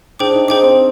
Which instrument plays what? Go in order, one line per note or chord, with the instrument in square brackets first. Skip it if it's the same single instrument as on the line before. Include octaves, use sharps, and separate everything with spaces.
[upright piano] D4 [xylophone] G#4 C5 G5 D6
[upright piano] D#4
[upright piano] D#4 [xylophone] G#4 C5 G5 D6
[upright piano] C4